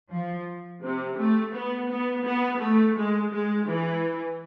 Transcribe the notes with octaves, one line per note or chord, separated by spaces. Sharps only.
F3
C3
A3
B3
B3
B3
A3
G#3
G#3
E3